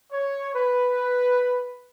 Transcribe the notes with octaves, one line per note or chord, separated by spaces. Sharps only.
C#5
B4